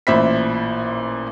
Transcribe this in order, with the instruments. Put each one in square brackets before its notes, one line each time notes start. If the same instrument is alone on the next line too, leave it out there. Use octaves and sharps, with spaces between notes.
[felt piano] A1 A#2 C5 E5 B5 B6